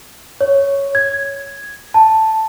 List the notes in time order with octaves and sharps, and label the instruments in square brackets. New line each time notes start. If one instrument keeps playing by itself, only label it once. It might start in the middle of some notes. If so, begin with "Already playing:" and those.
[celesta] C#5
G#6
A5